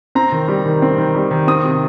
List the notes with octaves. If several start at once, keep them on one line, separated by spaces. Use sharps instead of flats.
C4 A#5
D#3
G3
D#3
C4
D#3
G3
D#3
C4 D#6
C3